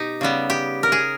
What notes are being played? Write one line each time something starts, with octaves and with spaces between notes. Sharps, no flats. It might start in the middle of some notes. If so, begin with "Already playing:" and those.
Already playing: B2 D#4 G4
C#3 G3 B3
G4
A#4
G#4